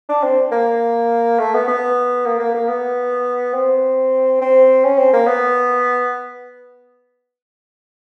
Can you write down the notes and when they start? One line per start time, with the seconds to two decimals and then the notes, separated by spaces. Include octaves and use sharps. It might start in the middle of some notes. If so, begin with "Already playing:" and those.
0.09 D4
0.23 C4
0.52 A#3
1.39 A3
1.54 B3
1.67 B3
2.26 A#3
2.39 A#3
2.54 A#3
2.68 B3
3.54 C4
4.41 C4
4.84 C#4
4.98 C4
5.13 A#3
5.27 B3